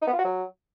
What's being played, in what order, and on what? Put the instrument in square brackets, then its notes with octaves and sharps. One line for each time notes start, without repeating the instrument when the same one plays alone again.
[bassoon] D#4
B3
F4
F#4
F#3